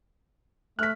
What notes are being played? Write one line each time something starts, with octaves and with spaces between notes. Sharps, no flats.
A3 F6 F#6 B6